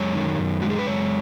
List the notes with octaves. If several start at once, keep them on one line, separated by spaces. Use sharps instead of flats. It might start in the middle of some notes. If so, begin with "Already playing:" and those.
Already playing: F#2 G#3 C#5
D#3
F#2
G#3 F#4
G#4
B4
F#2 C#5